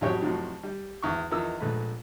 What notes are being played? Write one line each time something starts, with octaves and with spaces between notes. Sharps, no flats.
A1 F2 F#3 G4 C#5 G5
F2 A2 C3 F#3
G3
G#1 E2 C#6
E2 D#3 F3 D#4 E6
A#1 G#2 A3 B4